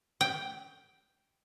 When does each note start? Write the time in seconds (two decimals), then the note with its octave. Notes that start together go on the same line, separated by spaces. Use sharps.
0.21 G5